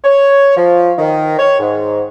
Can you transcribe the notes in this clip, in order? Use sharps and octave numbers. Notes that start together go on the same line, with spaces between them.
C#5
F3
D#3
C#5
G#2